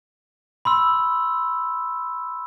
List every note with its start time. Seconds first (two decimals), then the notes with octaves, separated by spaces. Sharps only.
0.65 B5 C6 E6